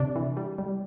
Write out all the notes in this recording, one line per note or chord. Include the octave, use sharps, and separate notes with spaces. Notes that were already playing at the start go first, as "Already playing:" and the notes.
Already playing: C3 D4
E3
G3
G3